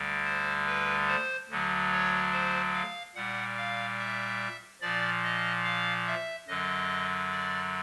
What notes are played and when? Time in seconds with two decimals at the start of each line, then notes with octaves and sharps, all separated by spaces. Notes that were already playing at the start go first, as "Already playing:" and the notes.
Already playing: D2 D3 G3
0.24 C5
0.67 B4
1.08 C5
1.49 D2 D3 F#3
1.91 C#5
2.33 C5
2.74 F5
3.15 A#2 G3 F#5
3.57 F5
3.99 E5
4.81 A#2 F3 D5
5.23 D#5
5.64 F5
6.07 E5
6.48 F#2 D3 F#3 D#5
7.31 D5